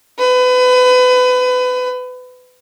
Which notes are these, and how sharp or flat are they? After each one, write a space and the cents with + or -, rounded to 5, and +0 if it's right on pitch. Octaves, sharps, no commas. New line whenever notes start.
B4 +30